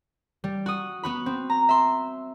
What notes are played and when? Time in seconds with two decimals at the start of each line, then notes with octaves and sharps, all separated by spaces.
0.44 G3
0.66 F#4 D#6
1.03 B3 F#4 B5
1.26 C4
1.50 A#5
1.69 E5 C6